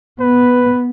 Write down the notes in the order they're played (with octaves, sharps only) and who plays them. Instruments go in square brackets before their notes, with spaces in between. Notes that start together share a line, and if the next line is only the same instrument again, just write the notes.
[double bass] B3 [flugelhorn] B4